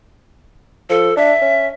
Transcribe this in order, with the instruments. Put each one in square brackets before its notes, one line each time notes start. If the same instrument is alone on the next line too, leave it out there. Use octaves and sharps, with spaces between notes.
[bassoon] F3 [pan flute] A4
[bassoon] D4 [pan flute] E5
[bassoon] C#4